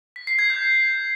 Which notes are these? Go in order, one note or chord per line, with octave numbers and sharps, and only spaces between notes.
B6
C7
G#6
G6